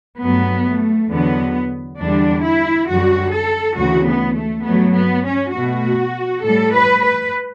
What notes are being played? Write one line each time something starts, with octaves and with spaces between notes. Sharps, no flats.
G2 F#3 A3 B3
A3
E2 D3 F#3 B3
E2 D3 G3 D4
E4
F#2 D3 G3 F#4
A4
D2 C#3 E3 F#4
B3
A3
G2 F#3 A3 B3
B3
C#4
B2 A3 F#4
A2 G3 A4
B4
B4